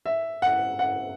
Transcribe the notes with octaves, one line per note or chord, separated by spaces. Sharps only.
E5
F#5
F#5